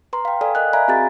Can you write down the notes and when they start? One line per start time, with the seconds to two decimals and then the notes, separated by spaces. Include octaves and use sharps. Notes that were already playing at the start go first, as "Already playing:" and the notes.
0.13 B4 A#5 C6
0.25 F5 G5
0.41 A4 D5 F5 G#5
0.55 A#4 D#5 F#6
0.73 D5 E5 F5 G#5 A#5 B5
0.88 C4 F#4 G#4 A#5 A6